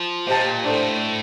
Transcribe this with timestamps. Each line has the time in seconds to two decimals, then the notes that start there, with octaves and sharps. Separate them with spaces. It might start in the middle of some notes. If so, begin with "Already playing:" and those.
Already playing: F3
0.26 A#2 G4 C5 D#5 A5
0.63 A2 D4 A4 C5